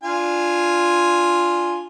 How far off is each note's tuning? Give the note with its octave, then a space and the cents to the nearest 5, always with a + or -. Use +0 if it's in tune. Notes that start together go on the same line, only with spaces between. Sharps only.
D4 +0 F4 +0 G#5 +0